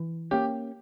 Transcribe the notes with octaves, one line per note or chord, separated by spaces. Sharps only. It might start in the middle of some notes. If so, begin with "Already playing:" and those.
Already playing: E3
A#3 C#4 G4